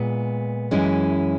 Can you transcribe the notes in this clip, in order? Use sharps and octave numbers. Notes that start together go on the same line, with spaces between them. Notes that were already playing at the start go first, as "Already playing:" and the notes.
Already playing: A#2 G#3 B3
F#2 E3 G#3 C#4 E4